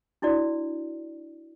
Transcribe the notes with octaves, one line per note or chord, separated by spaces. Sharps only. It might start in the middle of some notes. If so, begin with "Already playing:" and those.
D4 E4 F#4 D5